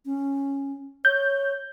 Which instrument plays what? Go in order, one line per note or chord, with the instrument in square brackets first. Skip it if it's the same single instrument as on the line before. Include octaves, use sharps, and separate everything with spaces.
[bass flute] C#4
[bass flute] C#5 [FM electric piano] G6